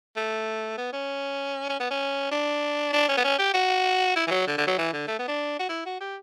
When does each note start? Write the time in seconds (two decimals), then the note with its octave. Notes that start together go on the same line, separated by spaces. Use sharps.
0.17 A3
0.78 B3
0.93 C#4
1.69 C#4
1.80 B3
1.91 C#4
2.32 D4
2.93 D4
3.09 C#4
3.18 B3
3.24 C#4
3.39 G4
3.54 F#4
4.16 E4
4.27 E3
4.31 F#3
4.47 D3
4.58 D3
4.67 F#3
4.78 E3
4.93 D3
5.08 A3
5.19 B3
5.28 D4
5.60 F#4
5.69 E4
5.86 F#4
6.01 G4